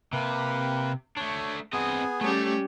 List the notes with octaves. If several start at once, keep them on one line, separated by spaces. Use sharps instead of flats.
C3 A#3 B4
A3 D4 C#5
B3 C4 G#4 D#5
G3 A3 C#4 G4